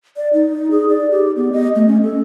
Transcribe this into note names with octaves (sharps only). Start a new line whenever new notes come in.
D5
D#4
G#4
D5
G4
B3
D#5
A3
C#4
A4